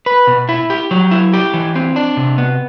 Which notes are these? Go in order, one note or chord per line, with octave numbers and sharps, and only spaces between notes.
B4
B2
E4
G4
F#3
E4
G4
E3
C4
D4
C3
B3